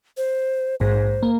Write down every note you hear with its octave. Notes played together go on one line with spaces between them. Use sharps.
C5
A#1 G#2 C5
A#3